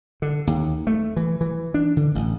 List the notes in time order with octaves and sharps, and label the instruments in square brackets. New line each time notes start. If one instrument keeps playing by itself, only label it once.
[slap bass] D3
D#2
A3
E3
E3
D4
D3
A1